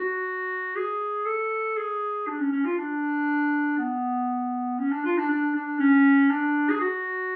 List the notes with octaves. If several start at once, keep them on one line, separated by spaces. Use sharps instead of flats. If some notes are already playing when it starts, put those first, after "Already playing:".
Already playing: F#4
G#4
A4
G#4
D4
C#4
C#4
F4
D4
B3
C#4
D4
F4
D4
D4
D4
C#4
D4
G#4
F#4